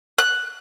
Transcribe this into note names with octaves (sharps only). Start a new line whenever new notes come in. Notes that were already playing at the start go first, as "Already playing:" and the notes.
F#6